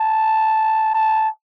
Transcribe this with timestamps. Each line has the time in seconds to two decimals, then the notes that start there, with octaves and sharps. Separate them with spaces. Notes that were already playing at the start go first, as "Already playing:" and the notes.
Already playing: A5
0.94 A5